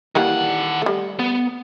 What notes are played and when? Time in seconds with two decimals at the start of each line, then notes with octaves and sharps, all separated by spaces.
0.15 D#3 E3 G3 A#3 F#5
0.82 G3 A3
1.19 B3